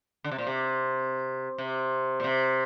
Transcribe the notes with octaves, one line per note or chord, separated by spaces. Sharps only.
D3
C3
A#2
C3
C3
A#2
C3